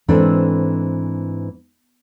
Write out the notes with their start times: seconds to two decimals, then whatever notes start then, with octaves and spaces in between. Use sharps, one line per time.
0.08 G#2 E3 C4 D4 A4